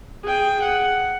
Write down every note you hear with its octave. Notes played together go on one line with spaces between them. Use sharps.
G#4 G5
F#5